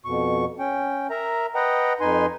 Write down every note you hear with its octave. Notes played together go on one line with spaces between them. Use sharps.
F2 B2 C#6
C#4 G5
A#4 E5 A#5
B4 D#5 F#5 G5 A#5
F2 D#4 B4 G#5 C6